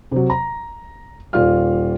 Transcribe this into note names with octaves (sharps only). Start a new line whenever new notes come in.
C3 F#3
A#5
D#1 F4 D5 F5 F6